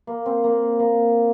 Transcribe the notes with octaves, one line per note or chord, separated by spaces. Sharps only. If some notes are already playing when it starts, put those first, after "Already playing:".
A#3
C4
A#3
A#3